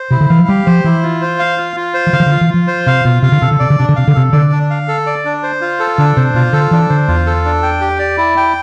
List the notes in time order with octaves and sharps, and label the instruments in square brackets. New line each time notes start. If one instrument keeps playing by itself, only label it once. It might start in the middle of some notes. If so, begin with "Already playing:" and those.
Already playing: [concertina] C5
[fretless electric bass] C3 [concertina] E4
[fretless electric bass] D3
[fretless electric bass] E3 [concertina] F5
[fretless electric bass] F3
[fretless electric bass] G3 [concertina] G4
[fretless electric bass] F3 [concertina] C5
[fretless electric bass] E3 [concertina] E4
[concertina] F4
C5
F5
F4
F4
C5
[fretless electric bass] E3
[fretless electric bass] D3 [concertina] F5
[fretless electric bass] E3
D3
[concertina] F4
[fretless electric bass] E3
[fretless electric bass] F3 [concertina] F4
[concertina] C5
[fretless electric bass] C3 [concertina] F5
[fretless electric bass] B2 [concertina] F4
[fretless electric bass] C3 [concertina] F5
[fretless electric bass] D3
[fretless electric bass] C3 [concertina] A4
[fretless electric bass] D3
[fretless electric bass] C3 [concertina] D5
[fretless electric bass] D3
[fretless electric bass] C3 [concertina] D4
[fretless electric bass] D3
[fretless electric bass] C3 [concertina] F5
[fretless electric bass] D3
[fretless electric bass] C3 [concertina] A4
[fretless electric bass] D3 [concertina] D5
[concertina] D4
F5
A4
D5
D4
C5
F4
A4
[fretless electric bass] D3 [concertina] D4
[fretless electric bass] C3 [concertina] C5
[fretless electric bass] B2 [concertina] F4
[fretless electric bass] D3 [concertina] A4
[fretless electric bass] E3 [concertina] D4
[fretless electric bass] D3 [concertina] C5
[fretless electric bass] E2 [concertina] F4
[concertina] A4
D4
G5
G4
D5
E4
G5